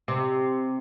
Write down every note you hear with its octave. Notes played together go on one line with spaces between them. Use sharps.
C3